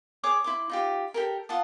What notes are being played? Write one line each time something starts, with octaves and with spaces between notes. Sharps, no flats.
G#4 C#5 D6 D#6
E4 C6 D6
D#4 F4 G4
G4 A4 A#4
F4 F#5 A5 D#6